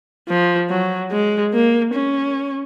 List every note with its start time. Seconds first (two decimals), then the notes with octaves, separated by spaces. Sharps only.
0.29 F3
0.70 F#3
1.12 G#3
1.53 A#3
1.93 C#4